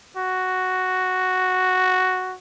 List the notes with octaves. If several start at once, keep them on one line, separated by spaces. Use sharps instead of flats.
F#4